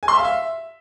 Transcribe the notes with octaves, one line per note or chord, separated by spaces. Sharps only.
G#5
C6
E5
F5
E5